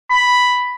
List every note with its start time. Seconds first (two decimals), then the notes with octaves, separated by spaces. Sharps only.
0.10 B5